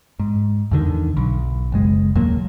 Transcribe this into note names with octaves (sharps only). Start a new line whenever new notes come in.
G#2
E2 D3 D#3
B1
F#1 G#3
D#2 A#2 F#3 A#3